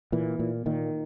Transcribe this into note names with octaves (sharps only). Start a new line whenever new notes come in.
A#2 E3
A#2
A#2 D#3